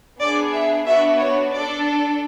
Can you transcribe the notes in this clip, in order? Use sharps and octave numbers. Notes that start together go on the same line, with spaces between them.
B3 D4 G#4 D5
E5
B3 D4 F#4 E5
C#5
D4 A4 D5